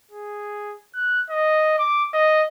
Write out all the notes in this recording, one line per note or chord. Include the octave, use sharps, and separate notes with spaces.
G#4
F#6
D#5
D6
D#5